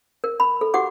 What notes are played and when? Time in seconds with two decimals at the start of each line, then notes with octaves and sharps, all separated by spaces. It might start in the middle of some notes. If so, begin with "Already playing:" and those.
0.24 A#4
0.40 B5
0.61 A4
0.74 F#4 G4 F#5 D6